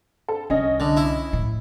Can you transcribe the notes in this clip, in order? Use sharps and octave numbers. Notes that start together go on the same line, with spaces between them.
A4
C2 C#4 D#5
D3
E4
A2